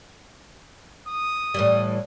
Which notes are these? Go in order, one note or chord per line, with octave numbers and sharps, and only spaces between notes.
D#6
A2 E3 G3